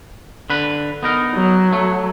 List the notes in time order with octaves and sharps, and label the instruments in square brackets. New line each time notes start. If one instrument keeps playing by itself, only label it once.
[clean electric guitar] D3 B4
B3 D#4 A#4
[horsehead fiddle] F#3
[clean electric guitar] A3